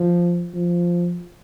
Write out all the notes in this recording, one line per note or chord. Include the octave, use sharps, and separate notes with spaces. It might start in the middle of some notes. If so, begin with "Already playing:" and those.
Already playing: F3
F3